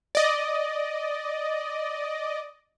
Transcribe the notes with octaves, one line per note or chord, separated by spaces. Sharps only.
D5 D#5